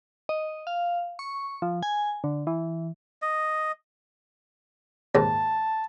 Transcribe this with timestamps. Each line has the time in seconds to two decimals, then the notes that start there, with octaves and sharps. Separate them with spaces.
0.29 D#5
0.67 F5
1.19 C#6
1.62 F3
1.83 G#5
2.24 D3
2.47 E3
3.22 D#5
5.15 D#2 G#2 A5